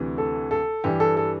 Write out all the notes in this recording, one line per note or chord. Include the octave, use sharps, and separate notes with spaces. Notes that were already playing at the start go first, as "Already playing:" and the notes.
Already playing: D2 C3 E3
A4
A4
G2 E3 G4
A4
A4